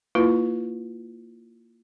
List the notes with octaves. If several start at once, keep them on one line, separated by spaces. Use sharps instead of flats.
A#3 E4 F4 B4